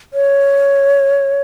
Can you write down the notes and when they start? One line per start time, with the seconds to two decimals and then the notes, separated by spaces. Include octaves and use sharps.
0.14 C#5